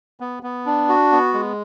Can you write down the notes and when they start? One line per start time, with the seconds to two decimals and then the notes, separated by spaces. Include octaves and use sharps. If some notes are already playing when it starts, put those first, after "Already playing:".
0.20 B3
0.43 B3
0.66 D4
0.89 F#4
1.12 B3
1.34 G#3